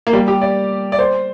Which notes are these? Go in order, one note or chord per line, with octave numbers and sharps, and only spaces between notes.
A#3
G3
G4
D5
D5
C5